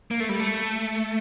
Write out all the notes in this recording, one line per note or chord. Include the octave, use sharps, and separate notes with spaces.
A#3
A3
G3
A3